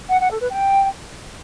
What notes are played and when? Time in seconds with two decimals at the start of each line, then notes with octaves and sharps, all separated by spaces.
0.09 F#5
0.20 F#5
0.30 A4
0.40 B4
0.51 G5